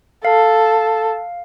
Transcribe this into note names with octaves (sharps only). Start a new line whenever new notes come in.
A4 F5